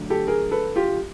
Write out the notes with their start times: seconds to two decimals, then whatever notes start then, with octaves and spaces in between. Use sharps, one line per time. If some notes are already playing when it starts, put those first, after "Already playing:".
Already playing: D3 F#3 A3
0.10 G4 A4
0.27 G#4 A#4
0.51 A4 B4
0.76 F4 G4